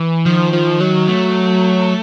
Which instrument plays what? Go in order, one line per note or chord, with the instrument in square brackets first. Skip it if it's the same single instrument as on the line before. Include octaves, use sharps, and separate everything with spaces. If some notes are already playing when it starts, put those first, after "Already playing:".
Already playing: [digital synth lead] E3
[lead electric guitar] D#3 [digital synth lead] F3
[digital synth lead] F3
F#3
[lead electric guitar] A3